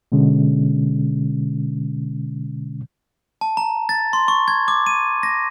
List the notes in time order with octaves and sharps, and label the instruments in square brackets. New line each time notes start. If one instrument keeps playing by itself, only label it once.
[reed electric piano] B2 D3 G#3 C#4
[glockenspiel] A5
A#5
A6
C6
C#6
G#6
D6
D#7
A#6